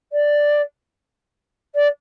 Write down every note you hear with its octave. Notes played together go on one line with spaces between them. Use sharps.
D5
D5